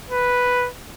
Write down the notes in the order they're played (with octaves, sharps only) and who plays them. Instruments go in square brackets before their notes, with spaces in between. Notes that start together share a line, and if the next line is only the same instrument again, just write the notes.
[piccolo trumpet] B4